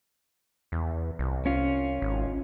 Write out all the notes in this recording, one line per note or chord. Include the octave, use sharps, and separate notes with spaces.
E2
C2
C#4 F4
G#1